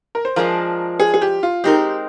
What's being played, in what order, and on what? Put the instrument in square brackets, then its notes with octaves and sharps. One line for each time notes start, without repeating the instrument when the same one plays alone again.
[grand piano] A#4
C5
[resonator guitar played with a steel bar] F3 G#3 D4 F4 [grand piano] A#4
[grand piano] G#4
G#4
G4
F4
[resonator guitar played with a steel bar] G#3 C4 D#4 A#4 [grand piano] G4